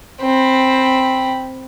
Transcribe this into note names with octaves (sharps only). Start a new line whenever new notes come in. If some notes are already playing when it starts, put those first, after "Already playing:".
C4 B5